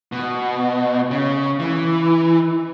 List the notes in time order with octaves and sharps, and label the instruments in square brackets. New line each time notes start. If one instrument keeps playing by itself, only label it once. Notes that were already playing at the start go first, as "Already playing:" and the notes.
[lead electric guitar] B2
C#3
E3